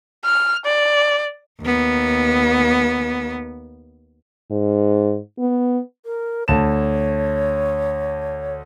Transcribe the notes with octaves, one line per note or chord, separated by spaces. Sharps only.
F6
D5
D#2 B3
G#2
B3
A#4
D2 C#5 A5 E7